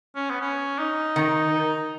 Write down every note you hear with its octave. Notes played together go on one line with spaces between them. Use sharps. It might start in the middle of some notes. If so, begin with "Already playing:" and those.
C#4
B3
C#4
D#4
D#3